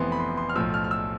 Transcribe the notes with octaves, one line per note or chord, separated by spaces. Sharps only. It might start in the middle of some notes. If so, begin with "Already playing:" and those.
Already playing: F1 F2 E3 B3 C6
B5
C6
C6
F6
B1 A2 F3 E6
F6
F6
E6